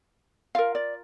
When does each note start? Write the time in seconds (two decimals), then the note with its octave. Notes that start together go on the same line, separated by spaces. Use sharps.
0.55 F4 A#4 F5
0.75 D5